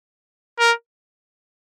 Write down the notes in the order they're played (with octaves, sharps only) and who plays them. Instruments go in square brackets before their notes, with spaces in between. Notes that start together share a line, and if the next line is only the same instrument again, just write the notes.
[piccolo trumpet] A#4